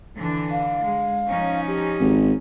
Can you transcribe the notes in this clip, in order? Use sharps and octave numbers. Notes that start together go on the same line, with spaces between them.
D3 E3 D4
F5
G#3
F3 C#4 D#4
G4
G#1